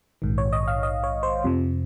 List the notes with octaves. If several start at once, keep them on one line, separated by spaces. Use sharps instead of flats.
A#1 G#2 D#3
C#5
D#5
F5
D#5
C#5
C5
F2 C3 F3